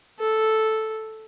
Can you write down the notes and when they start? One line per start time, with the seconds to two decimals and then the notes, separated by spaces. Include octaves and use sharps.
0.19 A4